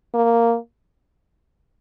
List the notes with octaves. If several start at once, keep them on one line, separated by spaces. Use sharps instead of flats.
A#3